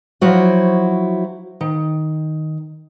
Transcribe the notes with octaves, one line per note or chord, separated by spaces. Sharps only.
F3 F#3 E4 F#4 C5
D#3